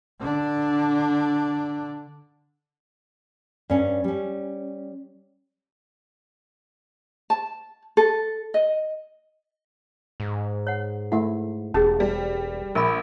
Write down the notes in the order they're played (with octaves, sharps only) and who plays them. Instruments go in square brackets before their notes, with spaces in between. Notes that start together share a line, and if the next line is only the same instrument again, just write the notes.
[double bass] D3 D4
[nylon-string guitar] G2 C#4
G3 C#4
[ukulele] A5
A4
D#5
[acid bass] G#2
[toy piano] C#5 F#5
[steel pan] A3 E4 [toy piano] F#5
[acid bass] E1 [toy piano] C#4 G4 G#4 [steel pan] A5
[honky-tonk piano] G3
[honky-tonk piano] A#1 [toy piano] A#4 B5